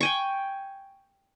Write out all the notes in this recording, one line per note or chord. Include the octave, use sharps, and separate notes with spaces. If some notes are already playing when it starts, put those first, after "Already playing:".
G5 G#5 C#6